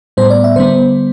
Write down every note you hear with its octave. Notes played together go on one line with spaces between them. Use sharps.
A2 G3 B3 C5
D5
E5
D3 G3 B3 C5